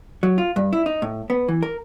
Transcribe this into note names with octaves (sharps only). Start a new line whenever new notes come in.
F#3
F4
G2
E4
D#4
A2
B3
E3
A#4